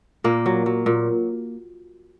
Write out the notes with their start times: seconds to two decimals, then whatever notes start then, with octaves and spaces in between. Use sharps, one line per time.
0.24 A#2 A#3
0.46 F#3
0.66 F#3
0.86 A#2